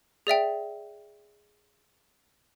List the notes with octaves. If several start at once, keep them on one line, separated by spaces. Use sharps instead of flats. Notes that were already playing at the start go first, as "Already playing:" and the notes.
G#4 D5 E5 G5